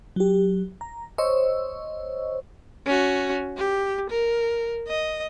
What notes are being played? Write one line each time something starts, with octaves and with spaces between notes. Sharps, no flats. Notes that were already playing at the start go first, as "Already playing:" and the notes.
F#3 G4
A#5
C5 C#5 D#5 C#6 E6
C#4 F#4
G4
A#4
D#5